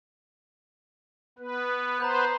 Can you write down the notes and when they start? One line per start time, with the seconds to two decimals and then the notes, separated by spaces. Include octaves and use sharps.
1.39 B3 B4
2.00 B4 C5 A#5 B5 G6